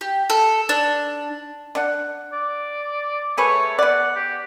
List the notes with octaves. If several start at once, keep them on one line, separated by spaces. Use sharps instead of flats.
G4
A4
D4
D4 F#5
D5
A3 G#4 B4 C#5
B3 D5 F#5
G4